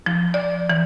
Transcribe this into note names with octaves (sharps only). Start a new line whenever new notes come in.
F3
D5
E3